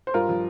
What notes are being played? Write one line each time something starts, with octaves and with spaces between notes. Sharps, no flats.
C5
G2 F4 A#4
F3